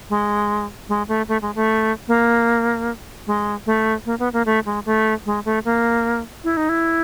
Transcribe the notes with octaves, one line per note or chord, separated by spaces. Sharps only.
G#3
G#3
A3
A3
G#3
A3
A#3
G#3
A3
A#3
B3
A#3
A3
G#3
A3
G#3
A3
A#3
E4
D#4
E4